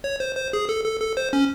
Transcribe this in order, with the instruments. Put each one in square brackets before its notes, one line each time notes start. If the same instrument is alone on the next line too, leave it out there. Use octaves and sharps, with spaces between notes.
[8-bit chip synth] C#5
C5
C5
G#4
A4
A4
A4
C5
C#4